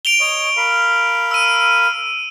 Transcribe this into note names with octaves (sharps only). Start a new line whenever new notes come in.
D7 F7 G7
C#5 D#5
A#4 F5 B5
E6 D#7